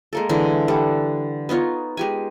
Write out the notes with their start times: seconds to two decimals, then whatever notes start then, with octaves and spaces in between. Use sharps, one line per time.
0.13 G#3 A#3 A4
0.29 D3 E3 G#3
0.68 G3 A4 F#5
1.49 B3 D#4 F4 C#5
1.97 G#3 G4 G#5